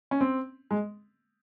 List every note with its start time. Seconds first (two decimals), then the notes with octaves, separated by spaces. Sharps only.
0.11 C#4
0.21 C4
0.71 G#3